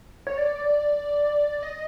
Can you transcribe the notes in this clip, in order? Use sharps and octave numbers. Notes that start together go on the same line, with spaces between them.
C#5
D5
D#5